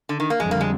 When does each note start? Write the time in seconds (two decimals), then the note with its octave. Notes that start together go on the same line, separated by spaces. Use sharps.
0.09 D3
0.20 D#3
0.30 A#3
0.40 F2 D3 G3 G#3 C4
0.51 A#3
0.61 G#3